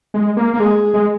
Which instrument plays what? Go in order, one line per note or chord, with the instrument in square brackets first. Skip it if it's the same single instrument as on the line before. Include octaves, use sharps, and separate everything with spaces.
[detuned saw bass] G#3
A#3
A#3
[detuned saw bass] G#3 [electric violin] G#4
[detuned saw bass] G#3